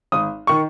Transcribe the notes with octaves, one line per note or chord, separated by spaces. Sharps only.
G#1 D#6
D#3 C#6